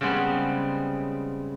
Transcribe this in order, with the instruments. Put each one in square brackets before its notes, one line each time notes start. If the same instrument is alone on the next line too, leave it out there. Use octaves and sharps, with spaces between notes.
[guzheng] C#3 G3 G#3 B3 C4